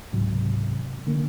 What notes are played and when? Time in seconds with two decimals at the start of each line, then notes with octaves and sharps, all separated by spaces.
0.13 C#2 G#2 C3 F#3
1.07 D3 A#3